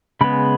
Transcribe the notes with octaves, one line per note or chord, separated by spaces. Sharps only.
C#3 G#3 B3 B5